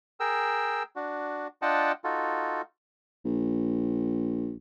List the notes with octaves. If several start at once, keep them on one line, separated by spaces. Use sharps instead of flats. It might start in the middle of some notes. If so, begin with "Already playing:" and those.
G#4 A#4 G5 E6
D4 F#4
D4 F4 D#5 F#5 G5 A5
D#4 F4 F#4 A4
A#1